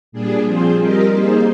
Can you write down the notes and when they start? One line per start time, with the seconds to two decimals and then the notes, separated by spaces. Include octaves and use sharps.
0.12 A#2 G3 D4 G#4
0.45 F3 C4 F4 G#4 C5
0.78 G3 C4 G4 A#4 D#5
1.12 G3 A#3 D#4 G#4 C5